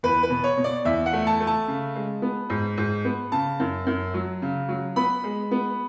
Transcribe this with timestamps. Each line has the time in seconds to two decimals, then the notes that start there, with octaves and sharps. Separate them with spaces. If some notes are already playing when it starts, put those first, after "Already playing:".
0.03 E2 B4
0.23 B4
0.30 B2
0.44 C#5
0.57 B2
0.64 D5
0.85 E2 E5
1.06 F#5
1.13 A3
1.27 A5
1.40 A3
1.47 A5
1.68 C#3
1.95 G#3
2.22 B3
2.50 G#2
2.78 G#2
3.05 B3
3.32 C#3 A5
3.60 F#2
3.87 F#2
4.14 F#3
4.42 C#3
4.68 F#3
4.96 B3 B5
5.24 G#3
5.51 B3